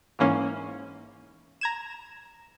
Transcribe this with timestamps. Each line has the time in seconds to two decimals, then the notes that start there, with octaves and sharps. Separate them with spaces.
0.19 G#2 E3 A#3 C#4
1.61 A#5 G#6 E7